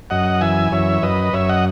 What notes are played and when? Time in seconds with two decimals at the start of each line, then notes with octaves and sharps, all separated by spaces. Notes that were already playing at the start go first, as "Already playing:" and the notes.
0.10 F#2 D#5 F#5
0.41 E3 E5 G#5
0.72 F#2 C#5 E5
1.03 F#2 B4 D#5
1.33 F#2 C#5 E5
1.49 D#5 F#5